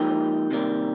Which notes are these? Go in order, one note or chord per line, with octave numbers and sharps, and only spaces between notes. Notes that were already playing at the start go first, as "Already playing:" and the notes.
Already playing: G#2 F3 A#3 D#4 G4
C3 D#3 G3 A#3